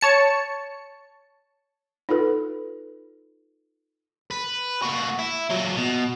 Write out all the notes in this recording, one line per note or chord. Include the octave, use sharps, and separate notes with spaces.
C#5 A5 C#7
D#4 F4 A4 B4
B4
A#2 F#4
E4
A#2 F#3
B2